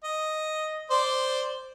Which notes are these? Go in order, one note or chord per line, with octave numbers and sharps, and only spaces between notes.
D#5
C5 D5